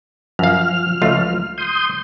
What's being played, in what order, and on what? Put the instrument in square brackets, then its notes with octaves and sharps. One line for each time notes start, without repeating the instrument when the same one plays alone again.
[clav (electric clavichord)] F#2 F5 [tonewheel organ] F3 F6
[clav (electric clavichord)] C#2 A3 F4
[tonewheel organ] C6 D#6 G6